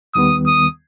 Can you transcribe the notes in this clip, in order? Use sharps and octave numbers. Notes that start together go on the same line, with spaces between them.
D#2 D#3 G3 B3 D#6
D#6